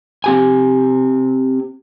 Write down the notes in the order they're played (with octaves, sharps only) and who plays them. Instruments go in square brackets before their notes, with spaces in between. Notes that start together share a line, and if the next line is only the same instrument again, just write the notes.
[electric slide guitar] C4 G4 G#5